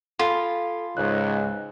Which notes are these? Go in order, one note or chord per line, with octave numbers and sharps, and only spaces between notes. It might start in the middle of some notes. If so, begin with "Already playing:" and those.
F4 A4 G#5 B5
C#2 G#2 F#6